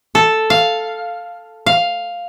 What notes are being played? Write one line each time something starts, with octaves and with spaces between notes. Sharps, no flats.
A4
F5
F5